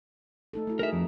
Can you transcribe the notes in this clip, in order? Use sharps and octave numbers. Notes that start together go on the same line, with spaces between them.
A3 D#4 A4
A3 E4 F#4
D#4 G#4 A#4 E5
F2